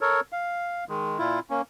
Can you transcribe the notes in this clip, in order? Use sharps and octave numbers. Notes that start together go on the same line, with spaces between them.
A4 A#4 C#5
F5
D#3 G#3
A#2 E4 F4
A#3 C#4